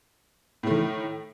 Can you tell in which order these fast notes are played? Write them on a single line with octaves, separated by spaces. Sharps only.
A2 A3 D#3